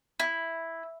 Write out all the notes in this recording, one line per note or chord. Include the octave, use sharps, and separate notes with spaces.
E4